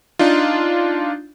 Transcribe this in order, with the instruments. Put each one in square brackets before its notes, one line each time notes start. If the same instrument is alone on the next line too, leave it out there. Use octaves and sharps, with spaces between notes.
[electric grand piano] D4 D#4 F4